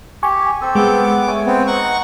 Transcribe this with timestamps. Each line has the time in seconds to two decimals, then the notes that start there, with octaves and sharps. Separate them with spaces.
0.23 G4 G#5 C#6
0.61 C4 A4
0.75 G#3 B3 D6
1.27 A3 C#5 G#5
1.46 B3 C4
1.67 D#4 F#5 C#6